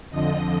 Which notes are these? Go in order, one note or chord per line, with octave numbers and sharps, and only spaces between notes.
F2 D3 F3 D#5